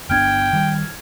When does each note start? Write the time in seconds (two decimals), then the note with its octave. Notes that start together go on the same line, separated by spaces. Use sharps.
0.10 G1 B3 D4 G5 F6 G#6
0.53 D#3 G3